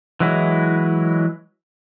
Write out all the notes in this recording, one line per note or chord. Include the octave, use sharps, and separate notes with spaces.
E3 F#3 G#3 E4